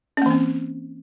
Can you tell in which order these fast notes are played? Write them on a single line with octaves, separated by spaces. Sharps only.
C#4 A#3 E3 C4